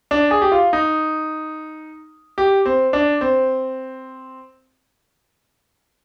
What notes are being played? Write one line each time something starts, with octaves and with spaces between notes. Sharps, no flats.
D4
G#4
G4
F4
D#4
G4
C4
D4
C4